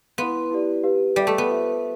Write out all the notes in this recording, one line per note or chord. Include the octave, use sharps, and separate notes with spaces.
B3 E4 B4 F5 C6
E4 G4 D5
G4 B4 F5
G3 A4 E5 G5 D6
A3
B3
F4 C5 E5